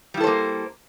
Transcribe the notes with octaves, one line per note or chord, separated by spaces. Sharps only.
G3 A#3 E4 A4 C5